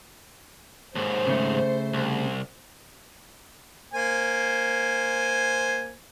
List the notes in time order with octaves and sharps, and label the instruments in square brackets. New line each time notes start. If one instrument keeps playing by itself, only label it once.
[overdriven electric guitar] D#2 G#2 [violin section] C5
[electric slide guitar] C#3 A3
[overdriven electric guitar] C2
[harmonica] A#3 C5 G#5